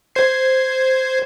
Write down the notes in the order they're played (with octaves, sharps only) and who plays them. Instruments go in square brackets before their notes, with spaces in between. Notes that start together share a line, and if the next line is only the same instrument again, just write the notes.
[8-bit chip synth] C5 G#6 C7